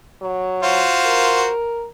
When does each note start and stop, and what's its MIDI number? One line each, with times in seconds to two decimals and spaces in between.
0.21 0.83 54
0.63 1.50 65
0.63 1.50 66
0.63 1.50 72
1.05 1.87 70